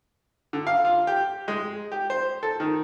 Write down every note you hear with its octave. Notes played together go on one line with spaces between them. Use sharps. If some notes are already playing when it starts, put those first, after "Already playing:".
D3
F5
F4
G4
G#3
G4
C5
A4
D#3